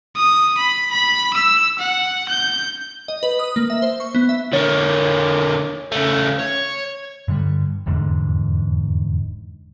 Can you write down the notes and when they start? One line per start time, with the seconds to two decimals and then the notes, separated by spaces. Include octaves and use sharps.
0.16 D#6
0.58 B5
0.91 B5
1.34 E6
1.79 F#5
2.29 G6
3.08 D#5
3.23 B4
3.39 D#6
3.56 A#3
3.70 E5
3.82 C5
4.00 C#6
4.15 B3
4.29 E5
4.53 D3 A#3 C#5
5.92 C#3 A3
6.39 C#5
7.28 G2 D3 F#3 G3
7.86 F1 E2 G#2 D3